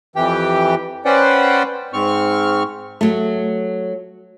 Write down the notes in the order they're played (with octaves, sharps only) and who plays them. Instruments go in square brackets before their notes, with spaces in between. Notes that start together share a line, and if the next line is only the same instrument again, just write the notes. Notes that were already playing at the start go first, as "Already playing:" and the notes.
[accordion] F2 E3 G4 G5
C#4 B4 C5 D5 F#5 G5
G#2 C4 C#6 F6
[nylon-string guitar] F#3 A3